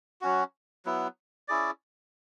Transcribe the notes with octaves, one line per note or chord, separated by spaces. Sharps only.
F#3 C#4 F#4
F#3 B3 E4
C#4 E4 G#4 D5